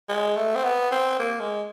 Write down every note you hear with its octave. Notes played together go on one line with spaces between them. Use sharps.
G#3
A3
C4
B3
C4
A#3
G#3